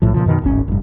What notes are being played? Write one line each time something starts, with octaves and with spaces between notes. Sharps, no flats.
B1 A2 F3
A#2 C#3 F3
F#2 B2 D#3
D1 G#1 C#4
F1 G2